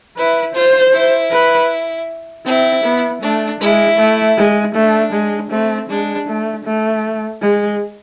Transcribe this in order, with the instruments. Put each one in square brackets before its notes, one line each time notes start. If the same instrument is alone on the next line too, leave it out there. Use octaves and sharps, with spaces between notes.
[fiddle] E4 [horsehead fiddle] B4
[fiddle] F4 [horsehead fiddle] C5
[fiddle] E4
[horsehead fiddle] B4
[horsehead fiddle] C4 [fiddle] E4
[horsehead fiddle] B3
[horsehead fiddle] A3 [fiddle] D4
[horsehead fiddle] G#3 [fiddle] E4
[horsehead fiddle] A3
G#3
[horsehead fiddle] A3 [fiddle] D4
[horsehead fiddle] G#3
[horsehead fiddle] A3 [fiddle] C4
[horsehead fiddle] G#3 [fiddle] D4
[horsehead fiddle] A3
A3
G#3